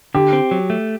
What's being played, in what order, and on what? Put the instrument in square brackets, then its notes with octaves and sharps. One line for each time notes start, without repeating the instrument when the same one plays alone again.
[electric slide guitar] D3 [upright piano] G4
[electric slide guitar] C4
F#3
A3